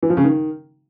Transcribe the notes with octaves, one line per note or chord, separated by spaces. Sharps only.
E3
F3
C#3
D#3